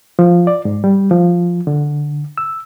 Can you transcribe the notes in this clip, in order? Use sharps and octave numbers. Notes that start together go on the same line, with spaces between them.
F3
D5
G#2
G3
F3
D3
E6